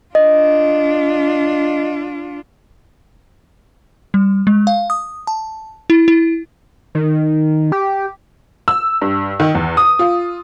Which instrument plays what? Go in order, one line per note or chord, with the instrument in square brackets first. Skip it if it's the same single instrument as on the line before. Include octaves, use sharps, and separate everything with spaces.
[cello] D4 F4 [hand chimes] D#5
[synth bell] G3
G#3
F5
D#6
A5
E4
E4
[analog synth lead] D#3
G4
[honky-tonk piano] E6
G2
D#3
E2
D#6
F4